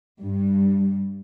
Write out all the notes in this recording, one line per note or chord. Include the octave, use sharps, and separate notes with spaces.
G2